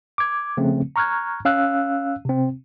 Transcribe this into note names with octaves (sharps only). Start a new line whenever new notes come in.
D6 G#6
C#3 F3 A3 C4
A#5 C#6 F6 F#6 G#6
C#4 F5 E6 F#6
C3 C4